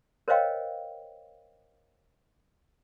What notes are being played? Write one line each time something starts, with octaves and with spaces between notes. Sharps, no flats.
A#4 C5 C#5 D#5 F5 G5